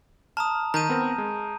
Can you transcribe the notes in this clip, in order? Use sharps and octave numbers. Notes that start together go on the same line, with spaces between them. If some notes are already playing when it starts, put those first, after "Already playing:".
A5 A#5 D#6 F6
D#3 A#5 G6 D#7
B3 C4 A#4
G#3